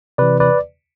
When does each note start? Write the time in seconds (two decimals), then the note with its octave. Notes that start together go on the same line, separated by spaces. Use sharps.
0.18 C3 E3 B4 D5
0.40 B4 D5